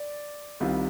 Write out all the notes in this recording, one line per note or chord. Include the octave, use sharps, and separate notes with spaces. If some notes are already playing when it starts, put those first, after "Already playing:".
Already playing: D5
C2 C3 D#3 G3 F4